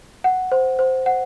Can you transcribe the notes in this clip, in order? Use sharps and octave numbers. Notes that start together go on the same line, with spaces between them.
F#5
C5
C5
F#5